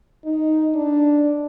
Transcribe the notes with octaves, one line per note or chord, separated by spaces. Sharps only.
D#4
D4